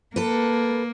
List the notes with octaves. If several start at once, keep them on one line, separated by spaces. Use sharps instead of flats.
A#3 A4 B4